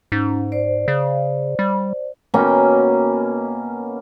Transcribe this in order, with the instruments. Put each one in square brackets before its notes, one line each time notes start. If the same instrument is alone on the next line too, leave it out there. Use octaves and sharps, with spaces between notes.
[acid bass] G#2 [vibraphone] C#4
[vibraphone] C5 D5
[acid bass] C#3
G3
[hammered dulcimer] B2 A#3 C#4 G5